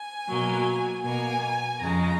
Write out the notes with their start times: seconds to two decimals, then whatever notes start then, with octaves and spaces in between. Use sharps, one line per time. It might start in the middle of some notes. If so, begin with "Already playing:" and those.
Already playing: G#5
0.28 B2 F#3 A#3
1.04 B2 A#3 G#5
1.81 F2 C#3 G#3 A#5